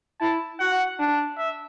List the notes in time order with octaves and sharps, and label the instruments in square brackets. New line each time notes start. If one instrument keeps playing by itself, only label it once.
[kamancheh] E4 [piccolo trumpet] A5
[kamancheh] F#4 [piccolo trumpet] F#5
[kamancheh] D4
[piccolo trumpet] E5